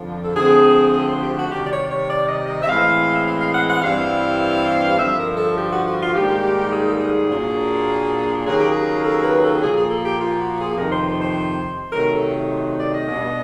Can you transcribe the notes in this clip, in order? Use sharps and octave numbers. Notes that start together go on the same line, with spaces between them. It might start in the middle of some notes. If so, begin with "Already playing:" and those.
Already playing: F2 D3 F3
A4
D3 F3 A3 C4 G#4
G#4
C5
G4
F#4
C3 D#3 G3 G4
D5
C#5
C#5
D5
D#5
D#5
E5
A2 E3 G#3 C4 F5
E5
F5
F5
F#5
F#5
G2 E3 G3 C4 E4 F5
G2 D3 F3 E5
A#4
A4
G4
F#4
F#4
F4
G#2 D#3 G3 A#3 G4
G#4
A4
G#4
A#2 F#3 A#3 D4
D#2 C#3 F#3 A#3 G#4
G4
G#4
A4
B4
A4
A#2 F3 A#3 G#4
G#4
A4
G4
F4
F#4
G#4
F2 C3 D#3 A#4
C5
C5
C5
C3 D#3 F#3 A3 A#4
A4
C5
D5
D#5
B2 G3 B3 D4